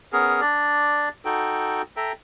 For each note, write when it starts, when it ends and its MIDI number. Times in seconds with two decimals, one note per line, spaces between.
0.13 0.41 59
0.13 0.41 61
0.13 0.41 68
0.13 0.41 70
0.41 1.09 62
0.41 1.09 74
1.25 1.82 63
1.25 1.82 66
1.25 1.82 69
1.25 1.82 79
1.97 2.12 69
1.97 2.12 76
1.97 2.12 79
1.97 2.12 82